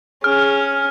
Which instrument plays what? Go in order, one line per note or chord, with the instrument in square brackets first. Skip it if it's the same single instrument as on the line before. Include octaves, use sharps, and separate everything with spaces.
[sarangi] C#4 [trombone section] G#4 [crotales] F6